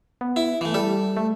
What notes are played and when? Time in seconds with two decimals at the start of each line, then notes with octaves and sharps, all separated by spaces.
0.21 B3
0.36 E4
0.61 E3 A3
0.74 G3 A4
1.17 A3